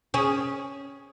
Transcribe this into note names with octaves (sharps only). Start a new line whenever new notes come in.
C#4 G#4